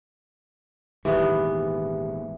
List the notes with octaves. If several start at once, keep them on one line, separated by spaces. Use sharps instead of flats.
D#1 D#2 G#2 E3 B3 G4